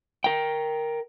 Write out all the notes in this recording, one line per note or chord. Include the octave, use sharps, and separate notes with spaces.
A#4 G5